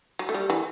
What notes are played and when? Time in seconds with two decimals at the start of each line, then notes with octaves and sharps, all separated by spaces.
0.19 F#3
0.29 A3
0.34 G3
0.50 E3